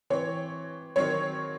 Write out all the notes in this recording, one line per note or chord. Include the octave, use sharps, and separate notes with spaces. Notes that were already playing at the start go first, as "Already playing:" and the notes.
E3 C4 C#5
D#3 F#3 C4 C#5